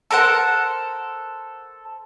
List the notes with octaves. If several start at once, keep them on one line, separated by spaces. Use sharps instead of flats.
A4 A#4 C5 F#5